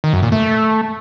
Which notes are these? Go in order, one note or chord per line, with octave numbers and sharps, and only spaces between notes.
D#3
F#2
A#2
A3